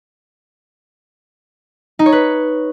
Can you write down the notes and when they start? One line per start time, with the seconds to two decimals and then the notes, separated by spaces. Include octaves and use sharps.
1.99 D#4
2.06 C#5
2.12 B4